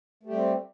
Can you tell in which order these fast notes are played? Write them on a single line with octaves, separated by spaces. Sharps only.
A3 G4 G3 C4